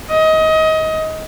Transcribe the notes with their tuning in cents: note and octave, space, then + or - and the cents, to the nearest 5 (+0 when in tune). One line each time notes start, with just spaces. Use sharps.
D#5 +25